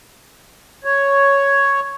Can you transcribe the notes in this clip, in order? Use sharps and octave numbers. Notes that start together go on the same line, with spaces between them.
C#5